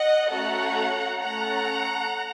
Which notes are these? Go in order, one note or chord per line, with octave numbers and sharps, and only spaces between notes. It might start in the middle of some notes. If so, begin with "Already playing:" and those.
Already playing: D#5 F#5
A3 C#4 F#4 A4 F#5 A#5
A3 C#4 A4 F#5 A#5